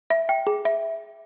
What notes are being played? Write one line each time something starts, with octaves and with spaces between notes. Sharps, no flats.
E5
G5
G#4
E5